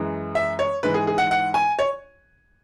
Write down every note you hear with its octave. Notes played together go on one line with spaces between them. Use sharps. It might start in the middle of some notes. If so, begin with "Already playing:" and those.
Already playing: F#2 E3 G#3
E5
C#5
G#2 E3 G#3 B4
G#4
G#4
F#5
F#5
G#5
C#5